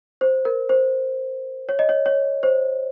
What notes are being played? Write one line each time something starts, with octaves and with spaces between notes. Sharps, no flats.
C5
A#4
C5
C#5
D#5
C#5
C#5
C5